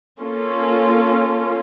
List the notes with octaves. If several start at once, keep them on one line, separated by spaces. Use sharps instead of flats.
A#3 C#4 F4 A4